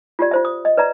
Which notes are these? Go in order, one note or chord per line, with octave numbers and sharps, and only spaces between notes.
F4 G4 D5
F4 C5 E5
D#6
D#5
B4 D5 E5 A#5